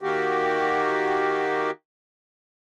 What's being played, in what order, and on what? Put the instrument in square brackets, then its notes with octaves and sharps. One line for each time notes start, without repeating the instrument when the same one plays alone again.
[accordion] D#3 A#3 F#4 G4